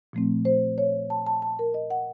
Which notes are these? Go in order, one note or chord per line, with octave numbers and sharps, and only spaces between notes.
A#2 F3 A3 C4
C5
C#5
A5
A5
A5
A#4
D#5
F#5